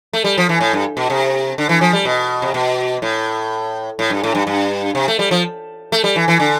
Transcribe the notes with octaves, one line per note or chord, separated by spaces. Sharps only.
A3
G3
F3
E3
A2
G2
B2
C3
D3
E3
F3
G3
B2
C3
B2
A2
A2
G2
A2
G2
G2
C3
A3
G3
F3
A3
G3
E3
E3
D3